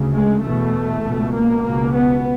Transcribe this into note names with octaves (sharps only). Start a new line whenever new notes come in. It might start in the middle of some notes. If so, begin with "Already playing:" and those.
Already playing: D2 C#3
G#3
E2 B2 A3
C#2 B2
A#3
C#2 B2 A#3
B3